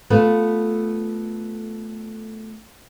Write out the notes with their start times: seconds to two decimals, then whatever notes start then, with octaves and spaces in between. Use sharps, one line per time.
0.10 A3 B3 F4 A4 B4